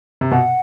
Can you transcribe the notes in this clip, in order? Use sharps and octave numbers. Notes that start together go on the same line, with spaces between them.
C3
B2 F#5